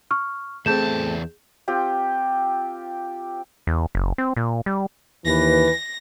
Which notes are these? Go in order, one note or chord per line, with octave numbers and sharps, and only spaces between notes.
C#6 F6
E2 A3 C4 G#4 A5 G6 E7
C4 F4 G4
E2
F#1
C4
A#2
G3
D#2 E3 B4 A#6